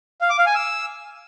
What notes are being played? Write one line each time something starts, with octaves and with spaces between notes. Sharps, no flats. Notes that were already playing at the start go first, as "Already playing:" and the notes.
F5
D6
F5
G#5
E6